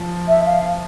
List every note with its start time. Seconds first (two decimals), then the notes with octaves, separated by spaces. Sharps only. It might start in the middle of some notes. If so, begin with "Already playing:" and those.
Already playing: F3
0.28 E5
0.46 F5